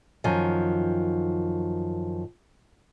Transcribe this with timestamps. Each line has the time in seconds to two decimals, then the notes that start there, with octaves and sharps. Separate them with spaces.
0.24 F#2 D#3 F3 G#5